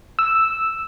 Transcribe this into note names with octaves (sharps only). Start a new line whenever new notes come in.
E6